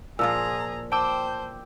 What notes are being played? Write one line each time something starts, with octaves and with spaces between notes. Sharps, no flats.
A#2 F3 F4 G#4 A#5 E6
C5 G5 A5 D6 E6